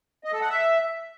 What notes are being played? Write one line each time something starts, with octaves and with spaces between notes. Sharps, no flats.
D#5
A4
F#5
E5